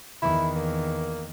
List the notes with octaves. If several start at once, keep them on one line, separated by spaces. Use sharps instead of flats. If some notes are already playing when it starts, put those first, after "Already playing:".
E2 D#3 E4
A#3